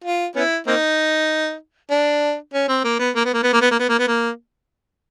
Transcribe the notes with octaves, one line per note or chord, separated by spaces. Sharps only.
F4
B3 C#4 E4
A#3 C4 D#4
D4
C#4
C4
A#3
B3
A#3
B3
A#3
B3
A#3
B3
A#3
B3
A#3
B3
A#3